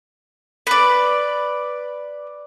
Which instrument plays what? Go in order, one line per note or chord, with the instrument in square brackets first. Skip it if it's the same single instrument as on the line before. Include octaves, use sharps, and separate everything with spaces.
[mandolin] B4 D5